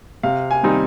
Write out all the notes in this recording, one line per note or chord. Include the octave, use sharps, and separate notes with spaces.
C3 F5
G#5
D#3 G3 C4 D#4